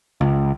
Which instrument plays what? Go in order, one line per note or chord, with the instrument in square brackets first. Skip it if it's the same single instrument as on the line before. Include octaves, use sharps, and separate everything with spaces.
[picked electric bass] C#2